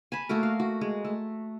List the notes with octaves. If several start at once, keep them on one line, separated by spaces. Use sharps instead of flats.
G#5 A5 B5
A3 A#3 F#4 A#4
F5
F#4
G#3
A3